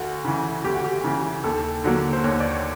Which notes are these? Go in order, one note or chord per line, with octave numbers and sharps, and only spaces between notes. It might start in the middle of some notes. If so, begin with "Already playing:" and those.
Already playing: D2 F#4
C#3 E3
D2 G4
F#4
G4
C#3 E3
D#2 A4
D3 F#3 A#3
C5
D#2 C#5
D5
C#5